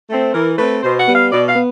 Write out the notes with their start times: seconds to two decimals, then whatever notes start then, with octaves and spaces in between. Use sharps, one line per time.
0.10 A3 C4
0.34 E3 A#4
0.58 A3 C4 B4
0.83 B2 C5
0.99 F#5
1.08 G3 B3
1.15 F5
1.31 B2 D5
1.48 F5
1.56 B3